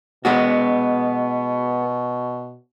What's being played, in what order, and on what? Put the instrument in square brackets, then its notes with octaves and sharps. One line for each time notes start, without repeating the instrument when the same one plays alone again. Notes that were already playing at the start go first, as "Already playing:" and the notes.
[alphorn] B2 [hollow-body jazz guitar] G#3 B3 F#4